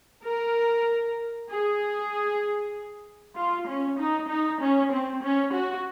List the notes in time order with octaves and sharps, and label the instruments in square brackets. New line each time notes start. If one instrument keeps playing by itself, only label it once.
[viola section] A#4
G#4
F4
C#4
D#4
D#4
C#4
C4
C#4
F#4